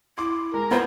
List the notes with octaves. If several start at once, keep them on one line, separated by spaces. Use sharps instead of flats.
E4 C6 D6
G#3 A#4
B3 F4 C5 B5 G#6